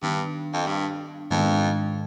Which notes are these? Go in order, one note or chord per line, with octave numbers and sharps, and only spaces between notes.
G2 D#3 B3 D4
F2
G2
F2 G#2 D#3 G#3 B3 D4